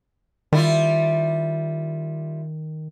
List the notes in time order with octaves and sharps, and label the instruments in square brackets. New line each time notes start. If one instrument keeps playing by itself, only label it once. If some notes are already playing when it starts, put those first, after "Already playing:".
[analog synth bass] D#3 [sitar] G3 E4 F4